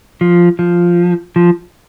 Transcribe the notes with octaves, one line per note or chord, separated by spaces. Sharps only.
F3
F3
F3